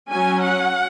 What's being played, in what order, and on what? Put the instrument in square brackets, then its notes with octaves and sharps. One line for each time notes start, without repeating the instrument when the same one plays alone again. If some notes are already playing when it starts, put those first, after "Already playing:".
[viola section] F#3 C#4 G#5
F#5